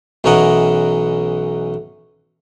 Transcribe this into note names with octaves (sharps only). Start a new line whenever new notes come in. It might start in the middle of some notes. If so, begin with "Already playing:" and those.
B1 E3 C#4 A#4 D#5 F#5